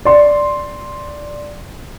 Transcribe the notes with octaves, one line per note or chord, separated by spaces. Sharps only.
D5 C6